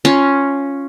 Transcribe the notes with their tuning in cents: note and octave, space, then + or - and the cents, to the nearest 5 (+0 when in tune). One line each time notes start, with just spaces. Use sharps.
C#4 +0 F4 +0